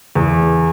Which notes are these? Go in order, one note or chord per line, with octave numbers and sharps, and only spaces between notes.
E2